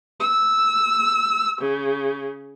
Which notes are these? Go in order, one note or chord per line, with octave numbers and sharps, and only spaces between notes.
E6
C#3